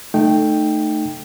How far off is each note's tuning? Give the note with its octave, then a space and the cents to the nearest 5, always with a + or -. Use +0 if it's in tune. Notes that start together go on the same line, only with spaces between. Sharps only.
A3 +0 D#4 -25 G5 +0